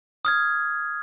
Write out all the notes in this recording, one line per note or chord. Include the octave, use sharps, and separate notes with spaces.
D#6 F6 G#6